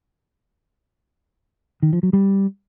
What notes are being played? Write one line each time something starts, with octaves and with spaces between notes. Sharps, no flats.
D#3
F3
F#3
G3